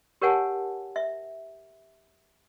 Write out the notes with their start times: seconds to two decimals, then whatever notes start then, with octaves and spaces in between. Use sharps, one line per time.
0.21 G4 A#4 C#5 F#5 G#5 A5
0.96 E5